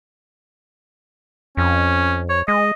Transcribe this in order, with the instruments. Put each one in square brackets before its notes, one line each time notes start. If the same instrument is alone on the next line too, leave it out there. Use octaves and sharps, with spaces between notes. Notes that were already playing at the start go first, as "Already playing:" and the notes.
[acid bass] F2 [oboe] C#4
[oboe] C#5
[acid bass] G#3 [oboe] D#5